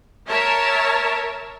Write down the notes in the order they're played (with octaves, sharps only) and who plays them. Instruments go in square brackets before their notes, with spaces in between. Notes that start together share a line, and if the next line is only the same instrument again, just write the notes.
[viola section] A#4 C#5 E5 A5